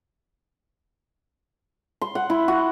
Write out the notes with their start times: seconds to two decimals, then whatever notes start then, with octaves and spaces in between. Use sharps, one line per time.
2.01 C6
2.15 F#5
2.30 E4
2.48 F#4